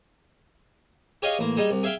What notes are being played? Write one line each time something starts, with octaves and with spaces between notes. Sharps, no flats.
G4 G#4 C#5 D#5 F5
A1 A#3
G3 G#3 D#4
C2
G#4 E5 F5 G5